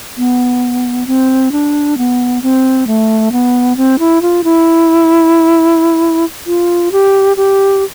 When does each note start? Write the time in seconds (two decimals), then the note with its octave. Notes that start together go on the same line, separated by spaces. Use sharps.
0.17 B3
1.07 C4
1.52 D4
1.98 B3
2.42 C4
2.87 A3
3.32 B3
3.77 C4
3.99 E4
4.22 F4
4.44 E4
6.47 F4
6.92 G4
7.37 G4